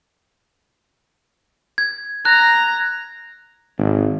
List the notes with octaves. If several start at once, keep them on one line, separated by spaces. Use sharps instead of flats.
G#6
A#5 F#6
G#1